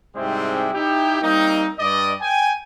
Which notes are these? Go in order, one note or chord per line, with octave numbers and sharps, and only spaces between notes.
G#2 C3 G3 G#3 C4 E4
D#4 E4 G4
G3 A#3 C4 D#4
G2 D5 D#5
G5 G#5